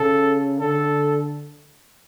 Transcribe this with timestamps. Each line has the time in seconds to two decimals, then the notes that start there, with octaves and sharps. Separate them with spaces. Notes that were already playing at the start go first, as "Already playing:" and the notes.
Already playing: C#3 A4
0.60 D3 A4